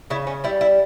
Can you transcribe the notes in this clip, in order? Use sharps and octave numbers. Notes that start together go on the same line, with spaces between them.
C#3 E4
C#4
G3 E4
E4